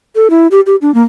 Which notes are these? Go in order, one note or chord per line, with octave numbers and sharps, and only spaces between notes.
A4
E4
G4
G4
D4
A#3